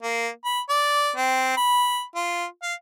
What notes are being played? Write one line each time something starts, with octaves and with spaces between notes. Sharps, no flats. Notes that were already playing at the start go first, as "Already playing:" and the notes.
A#3
B5
D5
C4
B5
F4
F5